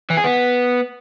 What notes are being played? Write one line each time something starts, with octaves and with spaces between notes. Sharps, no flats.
E3
G#4
B3